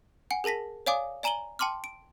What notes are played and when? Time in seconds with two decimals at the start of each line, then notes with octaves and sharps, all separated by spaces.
0.31 F#5 G#5 C#7
0.44 G#4 A#4 A5 A#6 B6
0.86 C#5 D5 F5 G#5 D6 D#6
1.23 D5 G#5 A#5 D#7 F#7 G7
1.59 G5 A5 C6 D6 F6
1.84 D7